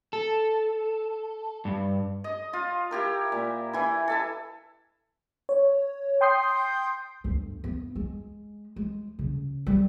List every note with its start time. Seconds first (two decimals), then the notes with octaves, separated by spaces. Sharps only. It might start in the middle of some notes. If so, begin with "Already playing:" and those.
0.13 A4
1.65 G2
2.24 D#5
2.53 F4
2.91 E4 G4 A#4
3.32 A#2
3.73 E3 E4
4.08 A4 E5 G#5
5.49 C#5
6.21 G5 C6 D#6 G6 C7
7.24 G1 D2
7.64 B3
7.96 G#3
8.76 G#3
9.19 C#3
9.67 G3